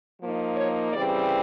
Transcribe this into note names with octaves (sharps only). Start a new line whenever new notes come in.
F3 A#3 D#4
C#5
C#3 E3 G3 C4 D5